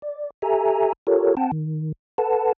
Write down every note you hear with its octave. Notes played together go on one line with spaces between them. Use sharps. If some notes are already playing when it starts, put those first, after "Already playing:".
D5
G4 A4 E5 G#5 A#5
F4 G4 A4 A#4 C#5
C4 F#5 G5 A5
D#3
A4 B4 F#5 A5